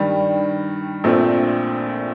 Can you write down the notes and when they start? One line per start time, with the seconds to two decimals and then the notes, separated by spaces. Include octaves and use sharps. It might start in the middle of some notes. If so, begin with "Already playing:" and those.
Already playing: G2 D#3 G3
1.04 A#1 A#2 A3 C4